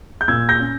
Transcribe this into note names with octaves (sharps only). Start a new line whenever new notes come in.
G6
A#2 E6 G#6
G6 A#6
C#4